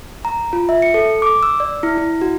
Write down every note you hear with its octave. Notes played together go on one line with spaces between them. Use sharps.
A#5
F4
E5
C#7
A4
D6
E6
D5
E4
E4
F#4